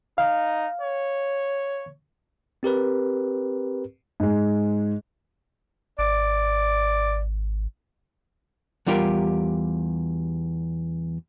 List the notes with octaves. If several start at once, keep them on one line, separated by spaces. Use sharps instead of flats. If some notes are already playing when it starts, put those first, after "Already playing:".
D#4 F5
C#5
C4 G4 A#4 B4
G#2 G#3
G#1 D5
E2 G3 F4 G4 A#4